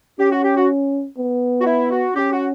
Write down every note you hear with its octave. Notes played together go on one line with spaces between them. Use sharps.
C#4 G4
F#4
G4
F#4
B3
F#4
E4
F#4
C#4 G4
F#4